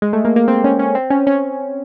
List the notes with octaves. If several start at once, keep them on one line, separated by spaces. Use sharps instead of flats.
G#3
A3
A#3
A#3
C4
C#4
C#4
C4
C#4
C#4